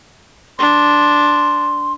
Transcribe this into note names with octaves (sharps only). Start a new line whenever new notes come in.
D4 C6